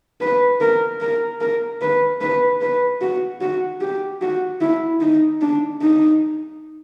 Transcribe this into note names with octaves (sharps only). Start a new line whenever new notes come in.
B4
A#4
A#4
A#4
B4
B4
B4
F#4
F#4
G4
F#4
E4
D#4
D4
D#4